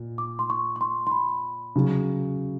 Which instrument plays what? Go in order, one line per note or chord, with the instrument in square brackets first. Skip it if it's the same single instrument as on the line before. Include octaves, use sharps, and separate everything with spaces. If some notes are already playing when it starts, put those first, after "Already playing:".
Already playing: [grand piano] A#2
[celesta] D6
C6
C#6
C#6
C6
C6
B5
[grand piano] C#3 F#3